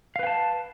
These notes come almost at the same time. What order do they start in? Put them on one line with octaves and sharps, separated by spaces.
F5 B4 G5 A5